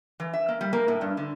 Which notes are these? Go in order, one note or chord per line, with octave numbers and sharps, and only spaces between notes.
E3
E5
A#3
G3
A#3
A2
G2
D3